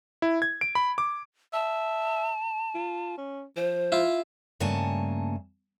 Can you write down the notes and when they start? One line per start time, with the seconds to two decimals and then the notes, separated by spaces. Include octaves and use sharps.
0.22 E4
0.42 G#6
0.61 D7
0.75 B5
0.98 D6
1.53 E5 A5
2.75 F4
3.17 C#4
3.57 F3 C5
3.92 E4 F4
4.60 G2 C#3 A3 A#3 G#5 A5